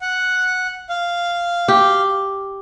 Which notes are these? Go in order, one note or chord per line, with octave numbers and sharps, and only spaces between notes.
F#5
F5
G4